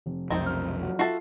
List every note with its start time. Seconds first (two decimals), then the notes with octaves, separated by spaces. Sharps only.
0.06 F1
0.30 B1 F2 C3 D#3 C4 D#4
0.46 F6
0.82 F#3
0.99 F4 F#4 A4 E5 C7